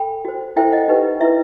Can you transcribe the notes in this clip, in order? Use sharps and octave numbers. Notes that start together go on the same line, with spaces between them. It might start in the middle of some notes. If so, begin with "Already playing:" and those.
Already playing: A4 G5 B5
F#4 C5
E4 A4 C5 E5 G5
D#5 F#5
D#4 G4 B4
E4 B4 E5